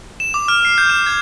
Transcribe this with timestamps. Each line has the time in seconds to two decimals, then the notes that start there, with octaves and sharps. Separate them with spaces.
0.20 E7
0.34 D6
0.48 F6
0.65 C7
0.78 G6
0.90 E7
1.06 G#6